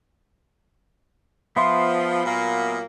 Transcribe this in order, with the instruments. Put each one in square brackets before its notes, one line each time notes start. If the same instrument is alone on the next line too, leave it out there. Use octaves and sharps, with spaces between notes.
[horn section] F3 [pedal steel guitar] B3 E5 C6
[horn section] A#2 F#3 A#3